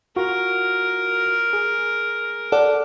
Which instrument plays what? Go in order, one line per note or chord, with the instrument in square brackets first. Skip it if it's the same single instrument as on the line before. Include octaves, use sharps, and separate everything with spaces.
[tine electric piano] F4 F#4 [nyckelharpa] A#4
[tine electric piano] G#4
[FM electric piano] A4 D5 F#5